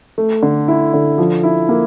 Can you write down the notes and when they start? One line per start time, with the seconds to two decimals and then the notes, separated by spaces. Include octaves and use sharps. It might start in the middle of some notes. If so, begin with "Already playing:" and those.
0.18 A3
0.43 D3
0.68 E4
0.94 D3
1.18 F3
1.43 E4
1.69 A#3